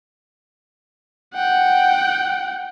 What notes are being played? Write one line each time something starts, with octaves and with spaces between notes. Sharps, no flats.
F#5 G5